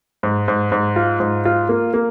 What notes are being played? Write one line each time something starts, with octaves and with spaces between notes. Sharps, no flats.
G#2
G#2
G#2
F4
G#2
F4
A#3
A#3